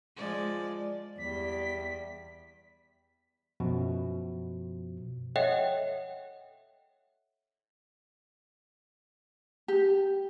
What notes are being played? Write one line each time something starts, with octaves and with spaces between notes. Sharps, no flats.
F3 G#3 D5
E2 G3 B6
F#2 B2 F3
A4 C#5 D#5 E5 F#5 G5
G4